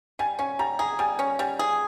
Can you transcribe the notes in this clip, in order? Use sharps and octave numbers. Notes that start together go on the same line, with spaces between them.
G3 G#5
C#4 G#5
G3 A#5
G#4 A#5
G3 G#5
C#4
G3 G#5
G#4